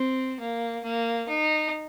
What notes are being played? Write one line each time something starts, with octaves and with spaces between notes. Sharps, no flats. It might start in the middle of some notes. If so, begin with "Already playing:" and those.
Already playing: C4
A#3
A#3
D#4